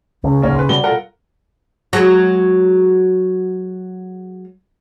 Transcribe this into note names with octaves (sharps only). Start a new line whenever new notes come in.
C#2 C#3
D1 B1 A#3 C#4
B4 C6
B2 G3 G7
F4 A4 A#4 F#5
F#3 G#3